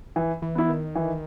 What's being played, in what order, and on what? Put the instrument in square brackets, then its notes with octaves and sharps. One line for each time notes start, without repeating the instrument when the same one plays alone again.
[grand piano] E3
[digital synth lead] E3
[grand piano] B3 E4
[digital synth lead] D#3
[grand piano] E3